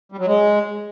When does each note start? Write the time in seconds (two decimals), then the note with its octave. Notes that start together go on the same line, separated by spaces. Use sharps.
0.12 G3
0.19 F#3
0.27 G#3